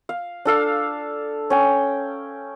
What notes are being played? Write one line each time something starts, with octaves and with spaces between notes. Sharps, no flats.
F5
D4 A4 F5
C#4 G5